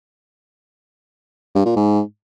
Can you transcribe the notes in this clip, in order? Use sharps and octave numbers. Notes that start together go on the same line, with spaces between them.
G2
A#2
G#2